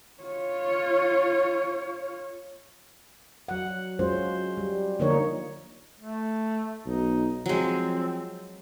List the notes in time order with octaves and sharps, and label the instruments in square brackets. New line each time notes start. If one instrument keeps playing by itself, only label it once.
[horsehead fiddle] F4 C#5
[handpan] F#3 F#5
F#3 G#3 C#4 F4 C5
G3
D3 F3 A#3 D#4 C#5
[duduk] A3
[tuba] B1 [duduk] D#4
[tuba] F3 [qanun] F#3 G#3 [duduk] C4